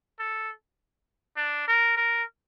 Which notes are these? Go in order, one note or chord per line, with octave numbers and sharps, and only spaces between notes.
A4
D4
A#4
A#4